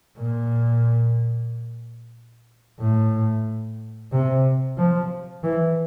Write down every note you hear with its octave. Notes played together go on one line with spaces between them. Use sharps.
A#2
A2
C3
F3
E3